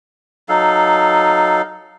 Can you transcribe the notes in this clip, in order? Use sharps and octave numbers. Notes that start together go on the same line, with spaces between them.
F#3 D#4 A4 F5